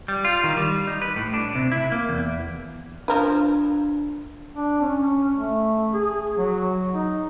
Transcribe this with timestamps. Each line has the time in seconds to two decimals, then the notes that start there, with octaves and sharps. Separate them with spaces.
0.08 G3
0.25 F4
0.44 D#3
0.57 G3
0.87 D#4
1.02 B4
1.16 A2
1.34 D4
1.55 C3
1.72 E4
1.92 A#3
2.09 E2
3.08 F3 D4 A#4 B4
4.55 D4
4.81 C#4
5.36 A3
5.94 G#4
6.38 F#3
6.94 D#4